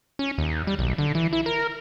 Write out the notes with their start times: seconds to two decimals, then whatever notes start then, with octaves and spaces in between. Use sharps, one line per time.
0.19 C#4
0.38 D#2
0.67 G3
0.79 B1
0.98 D3
1.15 E3
1.33 E4
1.46 A#4